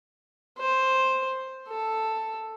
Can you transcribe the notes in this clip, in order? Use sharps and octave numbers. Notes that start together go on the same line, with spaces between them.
C5
A4